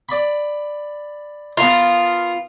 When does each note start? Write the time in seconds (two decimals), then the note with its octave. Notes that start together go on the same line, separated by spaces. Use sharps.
0.09 D5 B5
1.57 B3 F4 A#4 A5